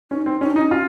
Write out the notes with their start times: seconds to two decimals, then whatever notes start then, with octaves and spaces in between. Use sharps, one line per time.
0.11 C#4 D#4
0.26 C4
0.41 C#4 D#4
0.51 D4
0.56 D#4
0.61 C#4
0.71 F4